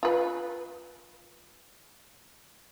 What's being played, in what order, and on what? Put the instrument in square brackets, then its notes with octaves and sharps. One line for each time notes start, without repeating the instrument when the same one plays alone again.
[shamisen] F4 B4